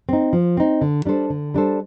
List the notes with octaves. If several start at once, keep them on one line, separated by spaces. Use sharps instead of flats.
C4 D#4
F3
C4 D#4
D3
G3 D4 A4 C5
D3
G3 D4 A4 C5